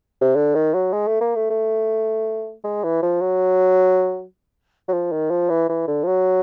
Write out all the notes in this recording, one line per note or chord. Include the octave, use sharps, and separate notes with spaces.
C3
D3
D#3
F#3
G#3
A3
A#3
A3
A3
G#3
E3
F3
F#3
F#3
F3
D#3
F3
E3
E3
D3
F3
F#3